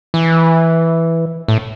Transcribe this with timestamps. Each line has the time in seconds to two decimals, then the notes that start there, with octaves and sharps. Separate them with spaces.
0.14 E3
1.48 A2